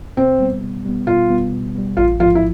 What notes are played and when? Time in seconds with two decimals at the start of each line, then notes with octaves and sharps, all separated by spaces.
0.17 B2 C4
0.39 G3 B3
0.62 B2
0.85 G3 B3
1.07 B2 F4
1.29 G3 B3
1.52 B2
1.75 G3 B3
1.97 A1 F4
2.20 G#2 F3 F4
2.35 E4